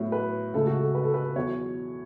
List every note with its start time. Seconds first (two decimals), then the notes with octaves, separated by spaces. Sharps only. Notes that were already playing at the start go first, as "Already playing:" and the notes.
Already playing: A2 F#3 B3
0.12 B4
0.54 C#2 C#3 A3 A4
0.67 F#4
0.80 A4
0.95 B4
1.04 A4
1.14 B4
1.36 E2 B2 F#3 C#5